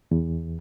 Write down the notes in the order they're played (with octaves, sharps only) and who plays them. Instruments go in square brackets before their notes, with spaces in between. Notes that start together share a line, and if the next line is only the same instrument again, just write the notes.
[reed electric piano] E2